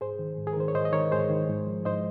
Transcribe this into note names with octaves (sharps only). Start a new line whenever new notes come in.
G#2 G#4 C5
D#3
G#2
G#4
A#4
D#3 C5
C#5
G#2 C5 D#5
D#5
D#3 A#4 C#5
G#2 G#4 C5
D#3
G#2
F3
G#2 C5 D#5